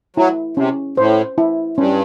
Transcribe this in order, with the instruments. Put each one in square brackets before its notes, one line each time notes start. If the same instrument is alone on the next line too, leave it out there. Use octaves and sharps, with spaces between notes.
[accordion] F#3 [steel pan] E4
[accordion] C3 [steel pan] C#4
[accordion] A2 [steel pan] C5
[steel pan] E4
[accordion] G2 [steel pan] C#4